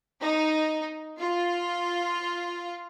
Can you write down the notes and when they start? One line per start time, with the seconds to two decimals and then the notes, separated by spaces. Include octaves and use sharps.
0.22 D#4
1.19 F4